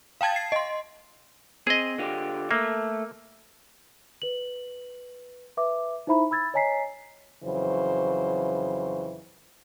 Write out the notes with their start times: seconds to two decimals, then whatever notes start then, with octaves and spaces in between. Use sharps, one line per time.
0.21 F5 G5 A5 G#6 A6
0.36 C7
0.52 D#5 C6
1.67 C4 G#4 D#5
1.98 D3 F4 G4
2.51 A3 A#3 A4 E5
4.22 B4 F#7
5.57 B4 E5 D6
6.07 D#4 E4 C5 E5 A#5 B5
6.31 B5 E6 G#6 A6
6.54 C#5 D#5 G#5 A#5 B6 C7
7.43 F2 C#3 E3 F#3 C5